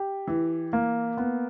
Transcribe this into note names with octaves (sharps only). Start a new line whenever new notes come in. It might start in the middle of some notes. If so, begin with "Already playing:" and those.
Already playing: G4
E3
A#3
B3